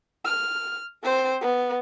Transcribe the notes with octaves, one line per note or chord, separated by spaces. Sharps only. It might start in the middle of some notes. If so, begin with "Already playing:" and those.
F6
C4 C5
B3